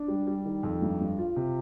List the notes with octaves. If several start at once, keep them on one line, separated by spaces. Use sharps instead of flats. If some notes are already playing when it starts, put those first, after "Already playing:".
Already playing: D4
G3
G3
D#3
F2
G2
G2
F4
C3